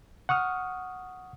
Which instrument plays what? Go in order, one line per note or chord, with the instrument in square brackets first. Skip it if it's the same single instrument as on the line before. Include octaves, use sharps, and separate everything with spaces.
[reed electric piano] F#5 C#6 D#6 F6